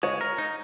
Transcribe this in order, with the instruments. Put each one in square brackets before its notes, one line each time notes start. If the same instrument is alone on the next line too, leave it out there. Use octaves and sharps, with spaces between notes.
[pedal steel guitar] G#3 [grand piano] C#5
[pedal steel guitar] A#4
D#4